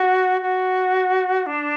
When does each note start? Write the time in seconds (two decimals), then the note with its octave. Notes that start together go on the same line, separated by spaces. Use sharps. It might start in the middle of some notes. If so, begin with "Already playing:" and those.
Already playing: F#4
0.42 F#4
1.46 D4